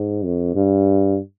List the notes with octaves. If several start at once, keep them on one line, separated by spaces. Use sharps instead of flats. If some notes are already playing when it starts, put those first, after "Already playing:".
Already playing: G#2
F2
G2